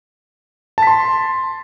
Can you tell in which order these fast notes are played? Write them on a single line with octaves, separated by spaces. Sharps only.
A5 B6 C6